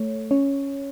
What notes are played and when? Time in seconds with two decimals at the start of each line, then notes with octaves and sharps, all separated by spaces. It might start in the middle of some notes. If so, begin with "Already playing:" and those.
Already playing: A3 C#5
0.31 C#4 C#5